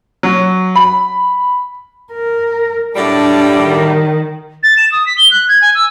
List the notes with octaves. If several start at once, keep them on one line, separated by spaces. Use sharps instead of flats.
F#3
B5
A#4
A2 F#3 G3 D4
D#3
A6
E7
D#6
B6
G7
F#6
G#6
G#5
E6